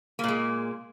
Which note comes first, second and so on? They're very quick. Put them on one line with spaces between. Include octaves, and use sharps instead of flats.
A#3 A#2 G#3